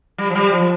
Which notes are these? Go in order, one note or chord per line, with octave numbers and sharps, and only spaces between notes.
G3
F3
G3
F3